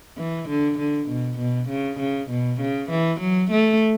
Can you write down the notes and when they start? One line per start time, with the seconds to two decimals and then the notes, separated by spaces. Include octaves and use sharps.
0.17 E3
0.49 D3
0.79 D3
1.09 B2
1.38 B2
1.69 C#3
1.99 C#3
2.30 B2
2.60 C#3
2.90 E3
3.21 F#3
3.51 A3